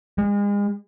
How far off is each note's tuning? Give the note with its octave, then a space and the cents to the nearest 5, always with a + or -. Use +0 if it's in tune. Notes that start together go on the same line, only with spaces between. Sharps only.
G#3 -35